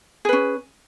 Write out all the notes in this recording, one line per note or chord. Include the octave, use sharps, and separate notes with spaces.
C#4 G#4 B4